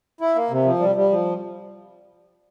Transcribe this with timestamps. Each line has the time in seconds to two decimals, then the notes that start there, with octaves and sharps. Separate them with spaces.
0.21 E4
0.36 A#3
0.50 C3
0.64 F3
0.79 G3
0.95 G3
1.09 F3